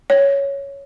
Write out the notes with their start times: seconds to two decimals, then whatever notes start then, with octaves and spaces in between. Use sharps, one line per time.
0.10 C#5